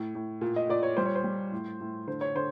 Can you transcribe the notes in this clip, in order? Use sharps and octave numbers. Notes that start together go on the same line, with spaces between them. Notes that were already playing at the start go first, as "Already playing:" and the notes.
Already playing: A2
A2
A#2
D#5
A#2 D5
C#5
G3 C5
C#5
C5
G3
A2
A2
D3 C5
C#5
D3 C5